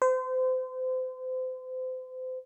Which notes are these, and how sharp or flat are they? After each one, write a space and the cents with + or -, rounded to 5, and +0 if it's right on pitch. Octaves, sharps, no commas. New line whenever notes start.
C5 -35